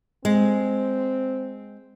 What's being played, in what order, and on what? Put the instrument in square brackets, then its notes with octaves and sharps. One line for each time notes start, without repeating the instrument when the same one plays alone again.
[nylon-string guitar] G#3 [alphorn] C4